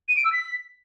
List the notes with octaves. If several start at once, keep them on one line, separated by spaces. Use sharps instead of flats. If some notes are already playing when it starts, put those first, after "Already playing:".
D#7
D7
E6
B6